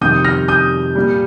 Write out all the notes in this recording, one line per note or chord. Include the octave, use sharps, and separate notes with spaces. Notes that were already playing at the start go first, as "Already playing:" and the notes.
F2 C3 D#3 G3 D#6 G6
F6 A#6
D#6 G6
A#2 G3